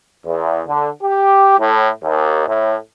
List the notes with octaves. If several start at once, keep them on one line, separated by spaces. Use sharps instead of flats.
E2
D3
G4
A2
D#2
A2